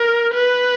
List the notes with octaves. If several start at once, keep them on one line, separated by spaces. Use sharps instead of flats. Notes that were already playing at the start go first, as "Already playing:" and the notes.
Already playing: A#4
B4